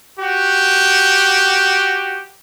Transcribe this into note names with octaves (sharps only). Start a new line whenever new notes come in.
F#4 G4